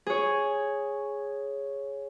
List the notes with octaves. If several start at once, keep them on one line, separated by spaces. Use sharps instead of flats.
G#4 C#5